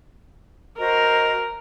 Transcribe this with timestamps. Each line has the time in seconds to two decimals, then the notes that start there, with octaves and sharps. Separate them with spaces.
0.79 F#4 A#4 C5 D#5